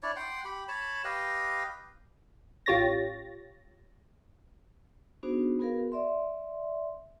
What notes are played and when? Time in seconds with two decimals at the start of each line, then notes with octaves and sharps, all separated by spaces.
0.03 D4 E4 C#5 D5
0.16 F#5 G5 C6
0.45 G4 B5
0.68 C#5 A5 B5
1.04 G4 B4 D#5 F5
2.66 A1 F4 G4 C#5 A6 A#6
5.23 B3 D4 D#4 F#4 G#4 C5
5.59 B3 F#4 G#4 A#4 B4 F5
5.92 D5 E5 C6